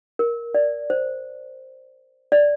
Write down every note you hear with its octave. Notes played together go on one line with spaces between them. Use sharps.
A#4
D5
C5
D5